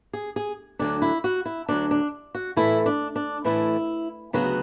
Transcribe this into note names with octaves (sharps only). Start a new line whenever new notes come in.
G#4
G#4
D2 D3 F#3 D4
E4
F#4
E4
D2 D3 F#3 D4
D4
F#4
A2 E3 A3 E4
D4
D4
A2 E3 A3 E4
D2 C#3 F#3 B3 F#4